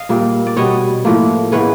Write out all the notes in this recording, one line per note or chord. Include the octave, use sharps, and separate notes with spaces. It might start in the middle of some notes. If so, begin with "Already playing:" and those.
Already playing: D#5 F5
A#2 G3 A#3
D5
B2 G3 B3 C#5 D#5
A2 F3 A#3
C#3 E3 G#3 B3 B4 C#5